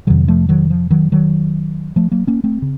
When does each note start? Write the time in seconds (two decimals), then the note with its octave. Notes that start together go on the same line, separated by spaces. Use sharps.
0.07 F2 C3 D#3 F#3
0.28 F3 A3
0.49 D#3 F#3
0.70 F3
0.91 D#3 F#3
1.12 D#3 F#3
1.96 F3 A3
2.12 F#3 A#3
2.27 A#3 C#4
2.44 A3 C4
2.62 C#3